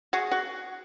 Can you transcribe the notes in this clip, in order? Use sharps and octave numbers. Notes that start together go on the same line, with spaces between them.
F#4 G#4
F#4